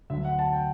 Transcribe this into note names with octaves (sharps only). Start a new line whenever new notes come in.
D2 D3 F#3 E5
F#5
A5
G5